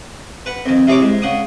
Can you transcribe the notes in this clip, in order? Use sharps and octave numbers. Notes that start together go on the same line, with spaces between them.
B4 F#5
F2 D#3
C3 E4 G#4 C#5 C#6 D6
G#2
C#3 F#5 D#6